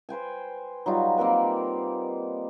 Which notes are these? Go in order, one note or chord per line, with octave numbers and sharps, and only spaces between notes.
B4 C5 G5 G#5
F#3 G3 D#4 F4
A#3 C4 A#4 B4